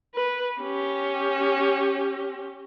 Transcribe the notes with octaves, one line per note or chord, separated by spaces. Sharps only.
B4
C#4 G4